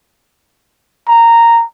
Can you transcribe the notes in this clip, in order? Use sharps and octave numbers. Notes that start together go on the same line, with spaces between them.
A#5